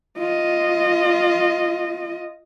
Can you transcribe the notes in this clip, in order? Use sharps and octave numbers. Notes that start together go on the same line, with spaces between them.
F4 D#5